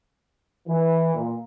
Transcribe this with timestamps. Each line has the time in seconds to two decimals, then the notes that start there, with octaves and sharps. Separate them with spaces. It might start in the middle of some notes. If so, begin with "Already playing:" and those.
0.68 E3
1.16 A#2